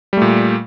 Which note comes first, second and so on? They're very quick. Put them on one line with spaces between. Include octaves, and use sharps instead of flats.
G3 A3 A#2